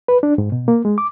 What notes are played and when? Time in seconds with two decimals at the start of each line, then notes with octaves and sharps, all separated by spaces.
0.08 B4
0.23 D4
0.38 G#2
0.52 B2
0.68 A#3
0.85 G#3
0.98 D6